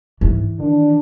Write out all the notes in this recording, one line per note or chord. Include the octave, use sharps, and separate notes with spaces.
G#2 E3
D#3 D4